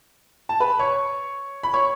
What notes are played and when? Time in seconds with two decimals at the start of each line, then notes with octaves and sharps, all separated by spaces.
0.49 A5
0.60 B4 B5
0.79 C#5 C#6
1.63 B5
1.74 C#5 C#6